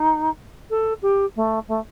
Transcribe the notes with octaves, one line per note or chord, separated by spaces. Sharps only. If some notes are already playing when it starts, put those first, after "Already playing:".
Already playing: D#4
A4
G4
A3
A3